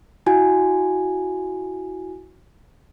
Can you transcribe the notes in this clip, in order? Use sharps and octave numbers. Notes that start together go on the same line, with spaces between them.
E4 F#4 G#5